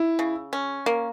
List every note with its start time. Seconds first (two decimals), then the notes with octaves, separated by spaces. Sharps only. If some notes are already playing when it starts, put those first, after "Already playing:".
Already playing: E4
0.19 C#3
0.53 C#4
0.86 A#3